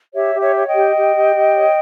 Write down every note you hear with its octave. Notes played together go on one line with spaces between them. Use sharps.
G4 C#5 E5
G4
C#5 E5
C#5
D#5 G5
G4
G4
G4
G4
C#5